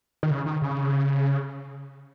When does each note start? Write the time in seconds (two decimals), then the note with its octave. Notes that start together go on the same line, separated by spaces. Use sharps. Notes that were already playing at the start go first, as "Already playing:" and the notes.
0.23 D#3
0.30 C#3
0.46 D#3
0.62 C#3